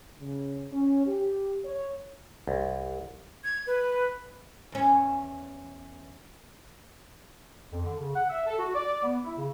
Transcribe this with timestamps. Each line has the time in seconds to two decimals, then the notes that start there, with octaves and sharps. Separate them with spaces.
0.20 C#3
0.72 C#4
1.06 G4
1.64 C#5
2.48 C2
3.44 G#6
3.67 B4
4.72 E2 C#4
7.72 F2
7.85 D3
7.99 C#3
8.15 F#5
8.29 E5
8.47 A4
8.59 F#4
8.74 D5
9.03 B3
9.25 E4
9.38 C#3